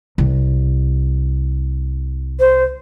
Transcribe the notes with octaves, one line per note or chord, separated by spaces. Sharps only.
C2
C5